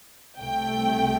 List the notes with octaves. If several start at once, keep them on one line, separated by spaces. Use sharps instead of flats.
C2 C3 A3 G5